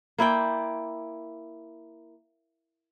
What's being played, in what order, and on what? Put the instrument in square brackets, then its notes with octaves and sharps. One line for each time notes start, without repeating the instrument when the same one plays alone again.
[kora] A#3 E4 D5 G5